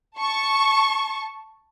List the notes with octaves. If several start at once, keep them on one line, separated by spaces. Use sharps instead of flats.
A5 C#6